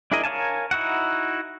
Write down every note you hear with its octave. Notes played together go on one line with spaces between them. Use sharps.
D4 E4 G#4 A#4 D#5
A#4 C#5 F5 G#5 A5
D#4 E4 F#4 F#5